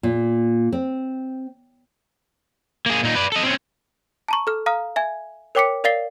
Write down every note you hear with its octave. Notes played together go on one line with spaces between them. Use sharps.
A#2
C4
A#3 G#4
A#2 D#4
B4 D5
A4 D#5
C4 C#4
A5 A#5 C#6
A4 F6
F5 A#5 D#6 F6
E5 G#5 G#6
A#4 C#5 G5 D6 B6 C#7
A#4 D5 F5 A6 C7 G7